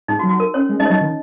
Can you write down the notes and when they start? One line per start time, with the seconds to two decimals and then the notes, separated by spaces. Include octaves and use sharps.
0.08 G#2 D#4
0.19 F#4
0.23 F#3
0.29 F#4
0.40 A#4
0.54 C#4 C#5
0.69 G#3
0.80 G#3 D#4 D#5
0.85 C#5
0.90 F#3 D#4 D#5
1.01 D#3